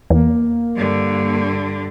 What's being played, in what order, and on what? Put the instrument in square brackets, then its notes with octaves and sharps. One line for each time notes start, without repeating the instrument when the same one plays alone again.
[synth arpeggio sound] E2 [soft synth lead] A#3
[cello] G2 D3